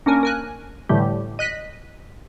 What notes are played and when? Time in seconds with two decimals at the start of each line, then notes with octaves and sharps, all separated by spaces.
0.06 A#3 C#4 D4 A#4 G#5
0.23 A#4 G#5 F#6
0.89 A2 D3 E3 G3 A3 G4
1.39 D#5 F#6 B6 D#7